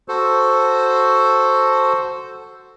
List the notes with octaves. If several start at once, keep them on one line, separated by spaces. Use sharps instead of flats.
F#4 A4 C5